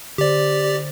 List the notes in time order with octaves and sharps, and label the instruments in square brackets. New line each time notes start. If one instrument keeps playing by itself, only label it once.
[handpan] D3 C5 [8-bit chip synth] G4 D5